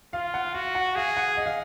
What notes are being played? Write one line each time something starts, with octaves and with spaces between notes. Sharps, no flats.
F4 F5
F#5
F#4 F5
F#5
G#4 F5
F#5
D#5
F5